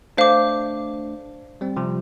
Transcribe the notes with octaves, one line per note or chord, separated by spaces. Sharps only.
A3 D4 C5 F5 D6
G3 C4
C3 F3